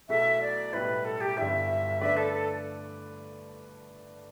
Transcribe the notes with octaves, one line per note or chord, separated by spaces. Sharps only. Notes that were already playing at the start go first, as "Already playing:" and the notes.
B1 B2 A3 E4 A4 E5
D5
B1 A2 G3 E4 B4
A4
G4
G1 G2 D3 G3 E4 E5
D3 A3 D4 B4 D5 E5
A4
A4